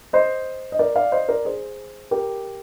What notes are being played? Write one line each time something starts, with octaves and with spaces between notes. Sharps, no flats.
C5 D#5
D#5
A#4 D5
D5 F5
C5 D#5
A#4 D5
G#4 C5
G4 A#4